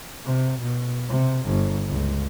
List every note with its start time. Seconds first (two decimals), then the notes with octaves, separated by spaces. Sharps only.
0.25 C3
0.61 B2
1.09 C3
1.46 G1
1.88 C#2